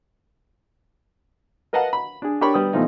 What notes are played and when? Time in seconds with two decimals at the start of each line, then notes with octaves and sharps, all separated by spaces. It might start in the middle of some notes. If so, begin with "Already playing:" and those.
1.73 A#4 B4 D#5 F5 F#5 A5
1.93 B5
2.22 D4 G#4
2.41 D4 G4 A#4 C#5 B5 C#6
2.54 G3 B3 D#6
2.73 B2 E3 F3 A3 D#4